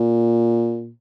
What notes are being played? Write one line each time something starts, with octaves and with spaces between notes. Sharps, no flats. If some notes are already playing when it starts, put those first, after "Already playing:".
Already playing: A#2